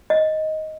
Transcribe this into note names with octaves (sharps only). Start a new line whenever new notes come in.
D#5